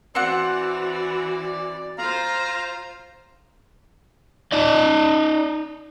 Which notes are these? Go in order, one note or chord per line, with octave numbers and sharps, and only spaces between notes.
E3 C4 F#4 D5 F#5
F4 C5 F5 A#5
D#4 D5 D#5